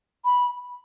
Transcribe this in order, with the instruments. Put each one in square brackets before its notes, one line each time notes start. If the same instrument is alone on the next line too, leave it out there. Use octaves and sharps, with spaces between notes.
[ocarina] B5